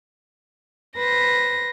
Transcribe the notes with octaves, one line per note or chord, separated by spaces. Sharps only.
B4 C5 A#6